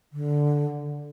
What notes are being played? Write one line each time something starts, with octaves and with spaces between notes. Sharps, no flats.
D3